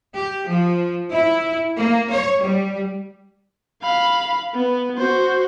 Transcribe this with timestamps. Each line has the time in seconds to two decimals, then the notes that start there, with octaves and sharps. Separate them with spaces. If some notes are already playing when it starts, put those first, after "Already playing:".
0.14 G4
0.47 F3
1.11 E4
1.76 A#3
2.10 C#5
2.42 G3
3.83 F5 B5
4.54 B3
4.97 F#4 C5